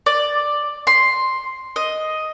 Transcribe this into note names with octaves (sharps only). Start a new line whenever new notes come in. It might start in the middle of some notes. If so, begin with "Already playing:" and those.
D5
C6
D#5